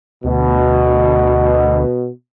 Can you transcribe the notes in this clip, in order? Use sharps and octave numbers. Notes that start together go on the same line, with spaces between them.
D2 B2